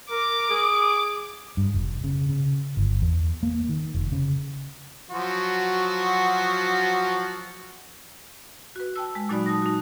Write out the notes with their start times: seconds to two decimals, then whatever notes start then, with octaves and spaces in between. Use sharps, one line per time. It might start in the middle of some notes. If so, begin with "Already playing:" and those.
0.11 A#4 D6
0.50 G#4
1.57 G2
1.74 F1
2.04 C#3
2.29 C#3
2.77 G1
3.02 E2
3.43 A#3
3.69 D#3
3.94 F1
4.12 C#3
5.10 F3 F#3 F#4
8.76 F#4 B4
8.96 G5 A5 E6
9.15 G#3
9.29 A#2 F#3 D#4 F#4 D5 B5
9.46 A5 D#6 A#6
9.62 D#4 F#4